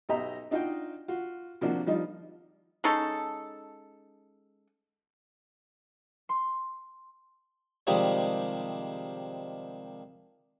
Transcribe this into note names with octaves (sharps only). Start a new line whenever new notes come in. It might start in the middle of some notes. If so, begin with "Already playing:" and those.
B1 G4 D#5 E5 A#5
D4 D#4 F4 F#4 D#5 G5
F4 F#4
C3 F3 A#3 D4 F#4
F3 G3 D#4 F4
G#3 C#4 D#4 A4
C6
C3 D#3 F3 G3 G#3